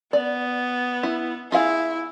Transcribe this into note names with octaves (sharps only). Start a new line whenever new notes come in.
B3 D5
E4
E4 F4 G#4 F5